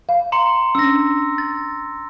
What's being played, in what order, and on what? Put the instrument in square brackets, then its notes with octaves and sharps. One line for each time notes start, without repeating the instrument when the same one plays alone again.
[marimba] F5
[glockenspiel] A#5 C6 C#7
[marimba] C#4 D4 [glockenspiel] E6 A#6
[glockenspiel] A6